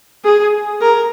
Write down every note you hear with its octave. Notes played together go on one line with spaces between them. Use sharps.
G#4
A#4